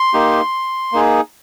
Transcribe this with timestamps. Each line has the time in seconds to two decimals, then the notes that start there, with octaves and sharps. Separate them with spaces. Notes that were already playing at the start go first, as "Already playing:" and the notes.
Already playing: C6
0.14 A#3 D#4 G4
0.92 A#3 D#4 G#4